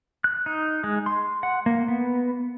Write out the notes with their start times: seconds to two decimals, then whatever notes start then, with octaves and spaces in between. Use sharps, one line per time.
0.24 F#6
0.46 D#4
0.84 G#3
1.06 C6
1.43 F#5
1.66 A#3
1.88 B3